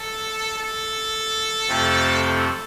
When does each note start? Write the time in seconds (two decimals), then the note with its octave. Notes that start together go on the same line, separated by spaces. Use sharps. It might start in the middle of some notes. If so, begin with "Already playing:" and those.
Already playing: A4
0.58 A4
1.68 F2 C3 F3 A3 C4
2.23 A4